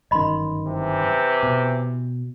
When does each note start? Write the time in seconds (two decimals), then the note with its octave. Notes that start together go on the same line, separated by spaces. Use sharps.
0.11 G1 F#2 D#3 D#5 B5 C6
0.67 C3 E3
1.43 B2